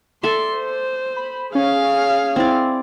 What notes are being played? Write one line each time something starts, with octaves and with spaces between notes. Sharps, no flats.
A4 D5 E5 C6
C5
B5
C#4 G#4 F5
C4 E4 D5